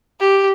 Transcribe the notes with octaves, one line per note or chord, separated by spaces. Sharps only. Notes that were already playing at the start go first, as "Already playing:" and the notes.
G4